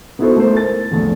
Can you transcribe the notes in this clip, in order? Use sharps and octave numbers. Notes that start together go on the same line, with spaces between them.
B3 D#4 E4 F#4 A4 C5
A3 A#4 C5
A6
A#1 E2 A3